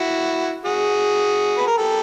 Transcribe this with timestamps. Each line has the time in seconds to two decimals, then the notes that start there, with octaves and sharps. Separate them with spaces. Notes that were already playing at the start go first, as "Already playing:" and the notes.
Already playing: E4 F#4
0.65 F#4 G#4
1.57 B4
1.67 A#4
1.78 G4 A4